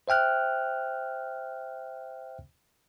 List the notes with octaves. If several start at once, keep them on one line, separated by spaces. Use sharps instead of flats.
C5 E5 G5 F6 F#6